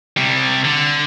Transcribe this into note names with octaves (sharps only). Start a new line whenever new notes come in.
C3 G3
D3